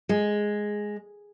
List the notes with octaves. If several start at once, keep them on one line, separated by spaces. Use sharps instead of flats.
G#3